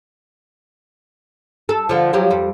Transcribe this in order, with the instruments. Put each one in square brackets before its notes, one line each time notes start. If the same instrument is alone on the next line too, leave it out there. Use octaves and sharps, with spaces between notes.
[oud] A4
D3 F3
F3 F#3 G4
F2 G3